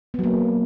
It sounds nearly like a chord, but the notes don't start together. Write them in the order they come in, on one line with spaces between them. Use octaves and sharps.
B3 F#3 A#3